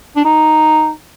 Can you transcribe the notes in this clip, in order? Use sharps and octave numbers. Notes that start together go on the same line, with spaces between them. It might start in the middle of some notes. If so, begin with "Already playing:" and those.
D4
D#4